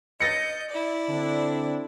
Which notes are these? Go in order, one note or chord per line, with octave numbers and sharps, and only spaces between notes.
D#5 G6 A6 A#6 C#7
E4 D5
D3 C4 D4